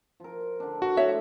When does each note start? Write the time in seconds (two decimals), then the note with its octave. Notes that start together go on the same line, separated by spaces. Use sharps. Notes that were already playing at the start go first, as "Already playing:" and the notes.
0.20 F3 A#4
0.60 D3 D4
0.82 F#4
0.97 A2 F3 A3 C#5 E5